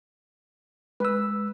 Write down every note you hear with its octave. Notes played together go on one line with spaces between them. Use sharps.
G#3 B4 E6